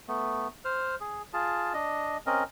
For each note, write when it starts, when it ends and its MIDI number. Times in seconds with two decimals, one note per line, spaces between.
0.08 0.48 57
0.08 0.48 59
0.65 0.95 72
0.65 0.95 89
1.00 1.22 68
1.33 1.73 65
1.33 1.73 68
1.33 1.73 81
1.74 2.17 62
1.74 2.17 75
2.26 2.43 60
2.26 2.43 61
2.26 2.43 70
2.26 2.43 75